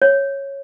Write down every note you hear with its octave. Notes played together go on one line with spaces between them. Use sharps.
C#5